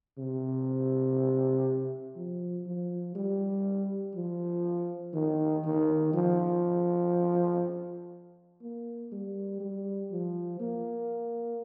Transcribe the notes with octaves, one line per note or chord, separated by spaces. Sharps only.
C3
F3
F3
G3
F3
D#3
D#3
F3
A#3
G3
G3
F3
A#3